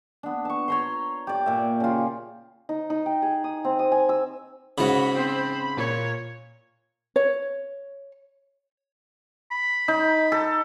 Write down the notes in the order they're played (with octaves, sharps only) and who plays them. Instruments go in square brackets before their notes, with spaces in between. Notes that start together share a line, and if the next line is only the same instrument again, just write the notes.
[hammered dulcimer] B3 D4
A5 C#6
C#5 A#5 C6
G4 D5
A#2 E5
C#3 F4
[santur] D#4
D#4
G5
G#4
D#6
C4
D#6
G#5
E6
[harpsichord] G#2 C#3 [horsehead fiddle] F#4 [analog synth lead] B5
[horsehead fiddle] C4 C5
[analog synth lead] A#2 [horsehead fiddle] C#5
[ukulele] C#5
[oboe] B5
[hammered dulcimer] D#4
A4